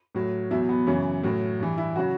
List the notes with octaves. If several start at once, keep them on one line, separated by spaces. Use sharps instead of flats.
A2 F#3
E2 B2 F#3 E4
B3
F#2 C#3 E3 C#4
A2 F#3
G2 E3
E4
C#3 F#3 F#4